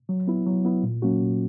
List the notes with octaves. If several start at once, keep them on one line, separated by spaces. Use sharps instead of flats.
F#3
B3 E4
F#3
B3 E4
A#2
F#3 A#3 C#4 F#4
A#2